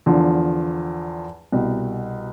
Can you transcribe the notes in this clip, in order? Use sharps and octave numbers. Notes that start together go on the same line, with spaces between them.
E2 D3 F3
C2 B2